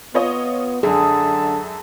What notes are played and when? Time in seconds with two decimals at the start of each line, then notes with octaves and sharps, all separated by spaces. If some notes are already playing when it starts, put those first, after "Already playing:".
0.14 B3 F4 C#5 D#5
0.83 F#2 D3 G#4 A5